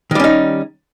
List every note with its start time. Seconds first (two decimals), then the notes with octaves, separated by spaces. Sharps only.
0.11 D#3
0.15 G3
0.20 C#4
0.24 D#4